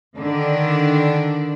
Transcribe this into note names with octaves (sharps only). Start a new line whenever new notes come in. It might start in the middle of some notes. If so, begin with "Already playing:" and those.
D3 D#3 D4